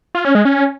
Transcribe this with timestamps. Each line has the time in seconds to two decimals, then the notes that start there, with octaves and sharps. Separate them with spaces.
0.15 F4
0.25 C#4
0.35 G#3
0.45 C#4